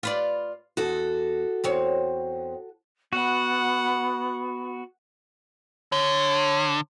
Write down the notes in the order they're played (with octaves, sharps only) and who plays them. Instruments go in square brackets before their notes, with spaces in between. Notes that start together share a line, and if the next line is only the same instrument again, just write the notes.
[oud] F4 B4 D5
[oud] E2 [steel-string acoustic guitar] F#4 A4
[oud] E2 C4 C#5
[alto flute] B3 [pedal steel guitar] F#4 [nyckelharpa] F#5
[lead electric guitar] D3 [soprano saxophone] C#5